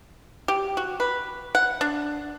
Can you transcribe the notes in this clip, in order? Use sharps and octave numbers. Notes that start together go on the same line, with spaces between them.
G4
F#4
B4
F#5
D4